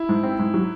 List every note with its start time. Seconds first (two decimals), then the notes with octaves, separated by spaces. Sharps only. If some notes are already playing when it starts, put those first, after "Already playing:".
Already playing: E4
0.09 G#2
0.23 C4
0.39 G#2
0.54 F#3